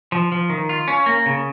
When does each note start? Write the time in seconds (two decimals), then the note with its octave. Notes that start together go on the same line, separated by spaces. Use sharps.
0.12 F3
0.32 F3
0.50 D#3
0.69 F4
0.88 C#4
1.06 A#3
1.26 C#3